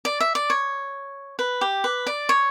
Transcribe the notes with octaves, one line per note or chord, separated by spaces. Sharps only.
D5
E5
D5
C#5
B4
G4
B4
D5
C#5